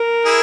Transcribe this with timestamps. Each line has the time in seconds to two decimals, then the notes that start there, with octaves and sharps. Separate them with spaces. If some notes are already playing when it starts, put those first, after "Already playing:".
Already playing: A#4
0.25 E4 G#4